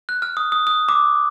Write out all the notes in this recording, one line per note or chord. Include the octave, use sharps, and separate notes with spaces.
F#6
F6
D#6
D#6
D#6
D6